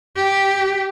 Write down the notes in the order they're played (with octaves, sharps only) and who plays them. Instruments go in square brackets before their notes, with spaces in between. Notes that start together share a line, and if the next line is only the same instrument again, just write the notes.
[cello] G4